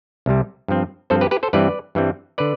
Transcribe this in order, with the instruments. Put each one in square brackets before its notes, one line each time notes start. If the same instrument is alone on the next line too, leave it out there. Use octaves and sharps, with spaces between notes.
[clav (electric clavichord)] C2 C3 G3
G2 F3 C4
G2 F3 C4 A4 C5
G4 B4
G4 B4
A4 C5
G2 E3 G3 C4 B4 D5
G2 E3 G3 C4
D3 B4 D5